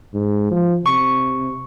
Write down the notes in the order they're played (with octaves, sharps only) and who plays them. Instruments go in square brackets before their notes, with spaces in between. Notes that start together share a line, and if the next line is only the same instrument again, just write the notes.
[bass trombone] G#2
F3
[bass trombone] C3 [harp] C#6